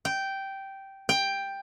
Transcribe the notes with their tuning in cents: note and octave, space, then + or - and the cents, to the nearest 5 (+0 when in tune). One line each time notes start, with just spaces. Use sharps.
G5 -10
G5 +10